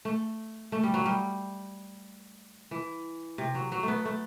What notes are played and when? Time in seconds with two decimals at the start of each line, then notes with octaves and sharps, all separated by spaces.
0.05 A3
0.72 A3
0.83 G3
0.94 F#3
1.06 G3
2.71 E3
3.38 C3
3.55 F#3
3.72 F#3
3.83 A3 B3
4.05 A3